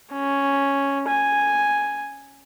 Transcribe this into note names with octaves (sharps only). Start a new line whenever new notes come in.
C#4
G#5